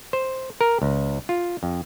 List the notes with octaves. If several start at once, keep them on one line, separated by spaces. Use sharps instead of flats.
C5
A#4
C#2
F4
F2